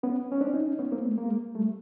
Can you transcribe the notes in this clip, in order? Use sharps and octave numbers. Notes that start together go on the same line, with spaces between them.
B3 C#4
C#4
C4 D4
C#4 D#4
C#4 D#4
B3 C#4
A#3 C4
A3 B3
G#3 A#3
G3 A3